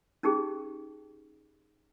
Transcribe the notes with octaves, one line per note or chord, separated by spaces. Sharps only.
C#4 D#4 G4 G#4